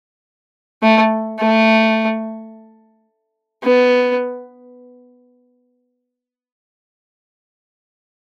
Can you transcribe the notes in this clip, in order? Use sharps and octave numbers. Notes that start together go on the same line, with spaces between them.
A3
A3
B3